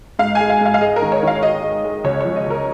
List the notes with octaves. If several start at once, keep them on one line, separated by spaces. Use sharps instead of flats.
G#2 F5
G#5
G#3
F5
G#2 F5
F5
G#3 D#5
A#4
D#3
C#5
D#3 F5
G#3 D#5
G#3
G#3
C#2 C#5
F3 C#5
D#5
C#2 A#4